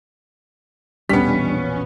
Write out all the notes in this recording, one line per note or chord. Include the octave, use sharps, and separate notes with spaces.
E1 A#1 G3 B3 C#4 D4 B6